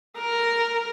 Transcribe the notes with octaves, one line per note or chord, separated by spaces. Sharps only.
A#4